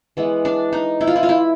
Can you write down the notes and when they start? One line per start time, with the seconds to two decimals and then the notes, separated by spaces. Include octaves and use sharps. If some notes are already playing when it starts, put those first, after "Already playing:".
0.17 E3 G#3 B3
0.45 D4
0.73 D#4
1.01 E4
1.07 F4
1.16 E4
1.23 F4
1.29 E4